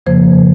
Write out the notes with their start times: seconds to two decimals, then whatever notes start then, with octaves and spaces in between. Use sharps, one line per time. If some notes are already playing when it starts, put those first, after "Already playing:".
0.06 F2 C#3 F3 A#3 C5